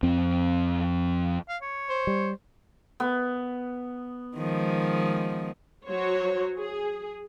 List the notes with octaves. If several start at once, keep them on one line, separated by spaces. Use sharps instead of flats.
F2 C4
F5
C#5
C5
G3
B3
D#3 F3 G#3
F#3 F#4 C5 C#5
G#4